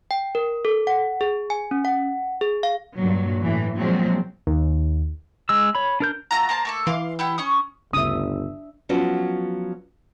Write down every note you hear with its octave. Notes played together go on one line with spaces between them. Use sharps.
G5
A#4
A4
F#5
G#4
G#5
C#4
F#5
G#4
F5
G2 A#2 F#3
A2 E3
A#2 F3 F#3 G#3 C4
D#2
G#3 E6
C#5 B5
D4 A#4 G6
A3 F4 F#4 A#5
A#3 C5 A5
A3 A#3 A4
E3 F5 C6 D6
E4 G4 F#5
C#4 C#6 D#6
G1 D2 C#3 D4 E5 D#6
F3 F#3 B3 C#4 F#4